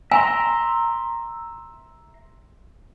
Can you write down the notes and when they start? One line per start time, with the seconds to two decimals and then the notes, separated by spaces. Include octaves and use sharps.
0.12 E5 G#5 A#5 C6